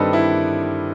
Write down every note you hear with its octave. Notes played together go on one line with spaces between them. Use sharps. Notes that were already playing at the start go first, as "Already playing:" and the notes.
Already playing: G2 D#3 G3 C4 A4 B4 D#5
E4